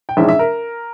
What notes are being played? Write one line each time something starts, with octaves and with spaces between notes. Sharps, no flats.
G5
A#1 G#2 E3 G#3 C#4 E5
E5
A#4